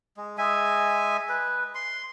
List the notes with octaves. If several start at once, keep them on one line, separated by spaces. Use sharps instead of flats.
G#3
G#3 E5 G#5
B4
C6